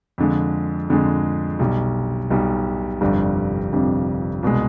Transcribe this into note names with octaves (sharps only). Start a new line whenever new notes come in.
F2 D3 G#3
F2 D3 G#3
B1 B2 G3
B1 B2 G3
G1 F2 C3 G3 D4
G1 F2 C3 G3 D4
C2 B2 G#3